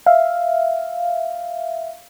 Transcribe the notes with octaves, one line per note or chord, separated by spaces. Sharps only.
E5 F5